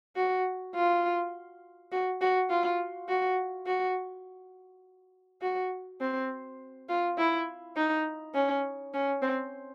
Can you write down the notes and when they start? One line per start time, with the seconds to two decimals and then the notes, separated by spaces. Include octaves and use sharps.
0.16 F#4
0.75 F4
1.92 F#4
2.21 F#4
2.50 F4
3.09 F#4
3.67 F#4
5.42 F#4
6.01 C4
6.89 F4
7.17 E4
7.76 D#4
8.34 C#4
8.94 C#4
9.22 C4